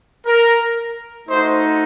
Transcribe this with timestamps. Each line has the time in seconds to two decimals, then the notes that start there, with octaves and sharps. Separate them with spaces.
0.26 A#4
1.28 A3 D#4 F#4 C5